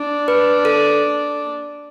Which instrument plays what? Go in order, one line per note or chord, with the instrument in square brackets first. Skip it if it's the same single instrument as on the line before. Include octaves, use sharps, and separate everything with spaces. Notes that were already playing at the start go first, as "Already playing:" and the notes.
Already playing: [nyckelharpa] D4
[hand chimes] B4
A4